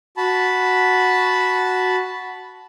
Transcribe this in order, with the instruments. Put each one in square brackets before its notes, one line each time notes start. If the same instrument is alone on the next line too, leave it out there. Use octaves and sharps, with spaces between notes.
[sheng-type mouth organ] F#4 A5 B5